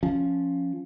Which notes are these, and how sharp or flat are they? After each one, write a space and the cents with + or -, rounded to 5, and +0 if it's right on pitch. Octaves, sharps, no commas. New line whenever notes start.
F3 +0 C#4 +0